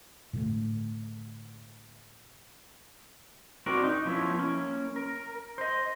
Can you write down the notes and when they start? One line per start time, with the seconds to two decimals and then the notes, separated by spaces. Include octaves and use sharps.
0.33 A2 D3 A3
3.66 C4 D4 F#4 A#4 D5
3.84 D#4
4.05 F3 B3 C#4 E4
4.39 A#3 C#4
4.96 A#4
5.58 C5 D#5